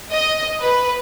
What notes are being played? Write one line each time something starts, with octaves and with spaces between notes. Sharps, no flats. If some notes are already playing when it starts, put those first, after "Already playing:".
D#5
B4